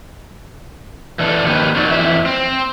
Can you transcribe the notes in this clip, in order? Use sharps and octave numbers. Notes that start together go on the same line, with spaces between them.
E3 D4 A4
D#3 F3 A#3 G4 B4
F2 F#3 D#4 F#4 D5
F2 E3 E5
C4